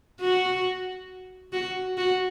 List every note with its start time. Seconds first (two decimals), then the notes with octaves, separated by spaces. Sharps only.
0.21 F#4
1.53 F#4
1.97 F#4